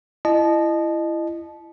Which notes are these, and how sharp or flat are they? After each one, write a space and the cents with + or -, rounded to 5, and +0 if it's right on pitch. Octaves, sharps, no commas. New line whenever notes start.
E4 +25 D#5 -25 A5 -25